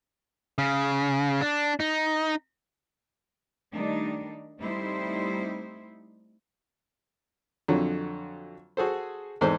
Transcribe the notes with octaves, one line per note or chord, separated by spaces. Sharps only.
C#3
D4
D#4
D#3 G3 A3 D4 D#4
G3 A3 C4 D#4 E4 C5
F2 D3 F#3
F#4 G#4 A4 C5
E2 G#2 A4 C5